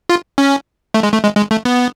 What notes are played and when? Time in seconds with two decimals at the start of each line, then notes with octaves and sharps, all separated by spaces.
0.09 F4
0.38 C#4
0.94 A3
1.03 G#3
1.13 A3
1.23 G#3
1.37 G#3
1.51 A3
1.65 B3